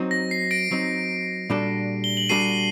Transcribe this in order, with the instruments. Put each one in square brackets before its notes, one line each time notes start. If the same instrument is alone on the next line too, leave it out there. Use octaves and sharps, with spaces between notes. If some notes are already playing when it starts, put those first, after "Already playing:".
Already playing: [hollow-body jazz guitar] F#3 C4 D#4
[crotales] A#6
C7
A#6 D7
[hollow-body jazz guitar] F#3 C4 D#4
A#2 G3 D4 F#4 A4
[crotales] G7
F#7
[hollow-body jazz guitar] A#2 G3 D4 F#4 A4 [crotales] C7 D#7